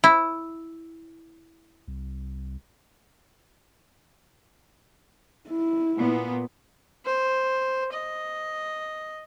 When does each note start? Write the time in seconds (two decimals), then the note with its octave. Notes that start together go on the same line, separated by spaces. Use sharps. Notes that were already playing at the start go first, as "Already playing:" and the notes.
0.04 E4
1.88 C2
5.50 E4
5.96 A#2 B3
7.06 C5
7.93 D#5